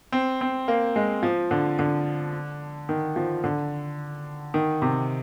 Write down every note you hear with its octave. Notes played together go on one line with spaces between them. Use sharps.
C4
C4
A#3
G#3
F3
D3
D3
D#3
F3
D3
D#3
C3